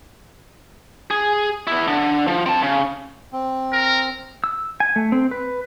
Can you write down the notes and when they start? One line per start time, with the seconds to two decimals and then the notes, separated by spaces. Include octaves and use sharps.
1.11 G#4
1.67 B3 E4
1.87 D3
2.27 F3
2.46 C4 A5
2.62 C#3
3.32 C4
3.73 A#4
4.44 E6
4.80 G#5
4.96 A3
5.12 C4
5.31 B4